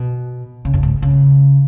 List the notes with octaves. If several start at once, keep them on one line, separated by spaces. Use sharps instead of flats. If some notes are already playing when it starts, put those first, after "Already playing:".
Already playing: B2
C#3
F#2
G#2
C#3